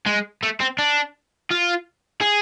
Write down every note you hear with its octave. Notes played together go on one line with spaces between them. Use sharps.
G#3
A3
C4
D4
F4
G#4